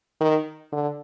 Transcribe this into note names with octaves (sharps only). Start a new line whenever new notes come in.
D#3
D3